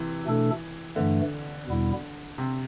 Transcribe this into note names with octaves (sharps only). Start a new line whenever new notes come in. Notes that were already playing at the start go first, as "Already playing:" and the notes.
Already playing: C3 E3
B2 A3 D4 A4
G2 D3 E3 A3
E2 B2 G3 B3 E4
C3